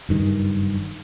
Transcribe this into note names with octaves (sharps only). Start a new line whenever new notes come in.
F#1 G2 D#3